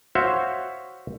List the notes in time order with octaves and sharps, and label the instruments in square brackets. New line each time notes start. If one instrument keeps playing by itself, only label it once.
[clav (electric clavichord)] F#4 C5 C#5 E5 F5